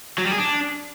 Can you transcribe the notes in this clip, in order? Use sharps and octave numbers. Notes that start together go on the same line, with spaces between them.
F#3
G3
G#4
D4